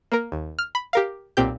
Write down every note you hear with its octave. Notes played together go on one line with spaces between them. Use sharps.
A#3 A#4
D#2
F6
B5
G4 A#4 F5
B1 A#2 C4 G4 G6